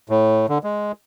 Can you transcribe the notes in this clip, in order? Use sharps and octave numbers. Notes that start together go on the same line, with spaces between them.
A2
D3
G#3